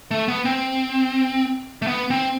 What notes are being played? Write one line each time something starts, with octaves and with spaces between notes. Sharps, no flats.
A3
B3
C4
A3
B3
C4